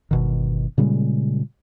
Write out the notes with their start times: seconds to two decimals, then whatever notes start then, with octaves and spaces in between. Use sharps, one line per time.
0.11 G1 B2 D#3
0.78 A#2 C#3 G3 G#3